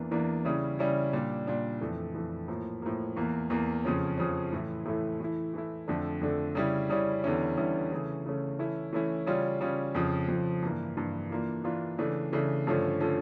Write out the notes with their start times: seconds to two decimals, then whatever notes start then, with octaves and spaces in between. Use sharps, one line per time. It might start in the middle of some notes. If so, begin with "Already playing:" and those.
Already playing: E2 E3 A#3 D4
0.11 E2 E3 A#3 D4
0.45 C#3 G3 C#4 E4
0.79 C#3 G3 C#4 E4
1.13 A#2 G3 D4
1.47 A#2 G3 D4
1.81 F2 E3 A3
2.14 F2 E3 A3
2.48 A2 F3 A#3
2.82 A2 F3 A#3
3.16 E2 E3 A#3
3.50 E2 E3 A#3
3.85 F2 C#3 F3 C#4
4.18 F2 C#3 F3 C#4
4.52 A2 E3 A3 E4
4.85 A2 E3 A3 E4
5.20 E3 A3 E4
5.54 E3 A3 E4
5.88 F2 D3 A3 D4
6.21 F2 D3 A3 D4
6.55 C#3 G3 C#4 E4
6.89 C#3 G3 C#4 E4
7.23 E2 D3 G3 C#4 E4
7.57 E2 D3 G3 C#4 E4
7.92 C#3 E3 A3 C#4
8.26 C#3 E3 A3 C#4
8.59 E3 A3 C#4 E4
8.93 E3 A3 C#4 E4
9.26 C#3 G3 C#4 F4
9.61 C#3 G3 C#4 F4
9.95 F2 C#3 F3
10.29 F2 C#3 F3
10.62 G2 E3 A#3
10.97 G2 E3 A#3
11.30 E3 A#3 D4 F4
11.64 E3 A#3 D4 F4
11.98 C#3 E3 A3 D4
12.33 C#3 E3 A3 D4
12.67 G2 D3 F3 A3 C#4
13.01 D3 F3 A3 C#4